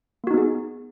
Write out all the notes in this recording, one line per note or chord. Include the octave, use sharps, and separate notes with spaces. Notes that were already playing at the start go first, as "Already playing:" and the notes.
A#3 B3 D#4 F#4 G#4